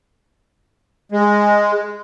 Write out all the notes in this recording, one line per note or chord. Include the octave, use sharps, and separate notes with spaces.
G#3